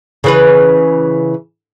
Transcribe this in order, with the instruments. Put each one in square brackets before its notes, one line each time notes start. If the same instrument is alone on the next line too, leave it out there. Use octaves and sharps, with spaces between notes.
[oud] C#3 E3 B4